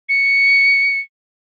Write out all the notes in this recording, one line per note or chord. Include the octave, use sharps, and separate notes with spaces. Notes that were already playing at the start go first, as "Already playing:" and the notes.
C#7